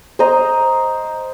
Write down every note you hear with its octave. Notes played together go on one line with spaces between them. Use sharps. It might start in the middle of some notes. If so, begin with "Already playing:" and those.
C5 D#5 A#5